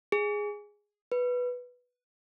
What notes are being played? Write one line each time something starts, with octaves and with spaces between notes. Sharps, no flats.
G#4
B4